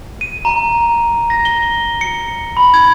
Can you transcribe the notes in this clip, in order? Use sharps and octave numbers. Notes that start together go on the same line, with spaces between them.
D#7
A#5
A#6
G7
C#7
B5
G#6